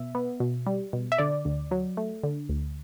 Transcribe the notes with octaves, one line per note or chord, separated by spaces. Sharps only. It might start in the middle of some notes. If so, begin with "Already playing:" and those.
Already playing: B2 E5
B3
B2
G3
B2
E5
D3 D5
D2
F#3
A3
D3
D2